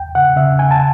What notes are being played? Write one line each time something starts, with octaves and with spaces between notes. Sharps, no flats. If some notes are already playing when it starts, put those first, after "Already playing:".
Already playing: E2 G5
C#3 F#5
C#3 E5
E2 G#5
A5